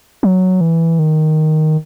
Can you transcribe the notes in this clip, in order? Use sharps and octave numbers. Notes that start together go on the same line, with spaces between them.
F#3
E3
D#3